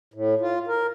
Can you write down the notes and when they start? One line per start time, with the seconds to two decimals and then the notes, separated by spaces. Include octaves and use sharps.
0.14 A2
0.41 F4
0.67 A#4